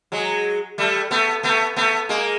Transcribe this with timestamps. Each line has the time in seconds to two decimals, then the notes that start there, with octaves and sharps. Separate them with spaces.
0.12 F#3 G#3
0.78 G3 A3
1.11 A3 B3
1.43 A3 B3
1.76 A3 B3
2.09 G#3 A#3